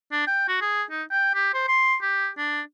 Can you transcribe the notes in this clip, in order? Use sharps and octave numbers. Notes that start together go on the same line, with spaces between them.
D4
G5
F#4
G#4
D#4
G5
G4
C5
C6
G4
D4